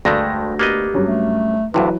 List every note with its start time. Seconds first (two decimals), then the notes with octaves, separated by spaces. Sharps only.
0.05 D2 G2 G#3 A3 D5 A#6
0.59 A#3 B3 G4 D#5
0.94 G2 F#3 C#4
1.06 A3
1.74 D2 G2 C3 E3 F#3 B4